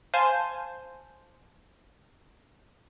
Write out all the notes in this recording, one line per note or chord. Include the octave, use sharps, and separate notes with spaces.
C5 F5 G#5 A5 C6 G6